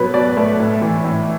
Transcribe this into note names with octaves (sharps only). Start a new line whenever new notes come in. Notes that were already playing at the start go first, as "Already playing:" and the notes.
Already playing: B2 F#3 B4
B2 D5
A3
A2
E3
A2